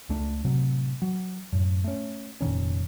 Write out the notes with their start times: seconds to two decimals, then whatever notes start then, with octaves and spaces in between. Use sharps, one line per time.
0.09 C#2 A3 D4
0.45 A2 C3 F#3
1.02 F#3
1.52 F#2 A2
1.84 A3 C#4
2.41 F1 A#2 D#3 C#4